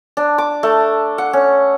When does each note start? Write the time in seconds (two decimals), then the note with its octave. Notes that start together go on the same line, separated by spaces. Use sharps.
0.17 D4
0.38 D6
0.63 A3
1.18 F#5
1.33 C#4